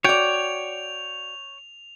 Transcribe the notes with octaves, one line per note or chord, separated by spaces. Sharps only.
F#4 C#5 D5 G5 F7